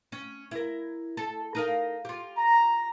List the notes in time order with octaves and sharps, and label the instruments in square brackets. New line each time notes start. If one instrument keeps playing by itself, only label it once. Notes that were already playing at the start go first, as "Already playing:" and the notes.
[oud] C#4
E4 A#4
A4
D#4 A#4 F5
F4 G4
[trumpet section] A#5